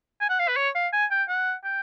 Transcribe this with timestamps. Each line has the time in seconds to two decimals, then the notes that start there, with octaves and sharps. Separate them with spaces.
0.21 G#5
0.29 F#5
0.39 F5
0.48 B4
0.57 C#5
0.75 F5
0.93 G#5
1.11 G5
1.28 F#5
1.64 G5